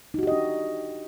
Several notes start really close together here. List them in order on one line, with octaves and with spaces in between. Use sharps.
D#4 F#4 G4 D#5 D4